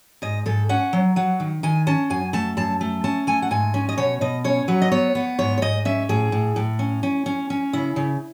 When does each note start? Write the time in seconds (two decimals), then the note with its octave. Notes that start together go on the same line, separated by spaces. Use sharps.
0.22 G#2 D#5
0.46 G#2 A4
0.69 C#4 F#5
0.93 F#3
1.16 F#3 F#5
1.40 D#3
1.63 D#3 G#5
1.87 C#4 A5
2.10 F#2 G#5
2.33 A3 A5
2.57 F#2 A5
2.81 A3
3.04 C#4 A5
3.27 A3 G#5
3.42 F#5
3.51 G#2 G#5
3.74 C#4
3.89 D#5
3.98 B2 C#5
4.21 B2 D#5
4.44 C#4 C#5
4.68 F#3 B4
4.82 D#5
4.91 B3 C#5
5.15 B3
5.39 G#2 C#5
5.58 C#5
5.62 G#2 D#5
5.85 C#4 E5
6.09 A2 G#4
6.32 A2
6.56 A2
6.79 C#4
7.03 C#4
7.26 C#4
7.50 C#4
7.73 C#3 E4
7.96 C#3